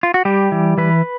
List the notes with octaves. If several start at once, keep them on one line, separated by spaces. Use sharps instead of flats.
F4
F#4
G3 G4
E3
E3 B4